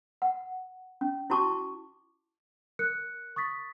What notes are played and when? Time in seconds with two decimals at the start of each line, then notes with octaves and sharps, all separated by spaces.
0.22 F#5
1.01 C#4
1.30 E4 F#4 A5 C#6 D6
2.79 A#4 F#6 C#7
3.36 C#6 D#6 A6 B6